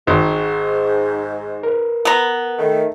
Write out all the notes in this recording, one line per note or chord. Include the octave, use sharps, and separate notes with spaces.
G#1 G#2 A#5 C#6
A#4 B4
B3 A#5
D#3 A3